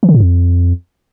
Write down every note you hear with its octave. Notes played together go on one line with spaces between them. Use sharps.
E3
D3
A2
F2